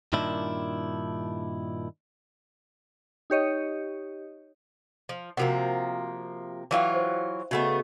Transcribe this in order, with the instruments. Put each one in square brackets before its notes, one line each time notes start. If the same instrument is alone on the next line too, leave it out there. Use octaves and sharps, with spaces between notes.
[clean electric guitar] G2 A#2 D#3 D4 E4
[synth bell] D#4 G4 C#5 D#5
[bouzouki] F3
[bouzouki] C3 F3 A#3 [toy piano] F#4 A#4 F#5
[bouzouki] E3 F#3 F4 [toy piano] D5 F5 G5
[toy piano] C5
[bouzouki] C#3 A3 B3 [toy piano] F#4 D#5